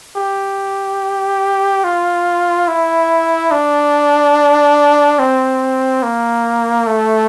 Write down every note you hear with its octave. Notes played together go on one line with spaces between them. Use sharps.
G4
F4
E4
D4
C4
A#3
A3